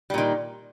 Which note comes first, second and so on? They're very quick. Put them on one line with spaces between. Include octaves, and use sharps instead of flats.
G3 A#2 D#3